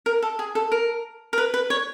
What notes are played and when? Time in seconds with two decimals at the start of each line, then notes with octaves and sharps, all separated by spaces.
0.06 A#4
0.22 A4
0.39 G#4
0.55 A4
0.72 A#4
1.33 A#4
1.38 B4
1.54 B4
1.70 C#5